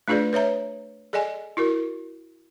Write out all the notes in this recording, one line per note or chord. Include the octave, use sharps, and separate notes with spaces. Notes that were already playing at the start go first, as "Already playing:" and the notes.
A3 D4 F4 G#4 B4 D5
B4 C#5 E5 A#5
G#4 A4 D5 D#5 G#5
E4 F#4 A#4